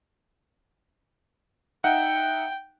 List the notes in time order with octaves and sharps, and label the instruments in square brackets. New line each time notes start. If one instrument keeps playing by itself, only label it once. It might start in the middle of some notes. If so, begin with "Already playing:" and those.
[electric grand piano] D#4 E5 F#5 [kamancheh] G5